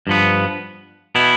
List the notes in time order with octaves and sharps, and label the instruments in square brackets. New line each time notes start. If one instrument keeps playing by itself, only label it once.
[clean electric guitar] G2 F3 B3
B2 B3 E4